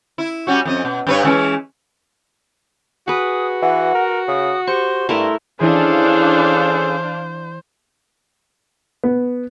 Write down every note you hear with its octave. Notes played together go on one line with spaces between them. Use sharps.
E4
G3 C#4 F#4
F2 D#5
B2
G2 B4 C#5
E3 G#3 C#4
F#4 G#4 B4 D#6
E3 F#5
A#4
C#3 D#6
G4 C5 C#6
G2 A3 E4 A#4 C6
E3 C#4 D4 E4 G#4 A4 C5 F5
B3